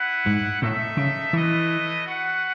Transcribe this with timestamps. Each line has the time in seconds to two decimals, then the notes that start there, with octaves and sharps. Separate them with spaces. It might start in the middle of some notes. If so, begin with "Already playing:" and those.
Already playing: E4 B4 F#5
0.26 G#2
0.61 A2 D#4 A4 E5
0.97 C#3
1.33 E3 A3 E4 B4 D#5
2.05 F#4 B4 F#5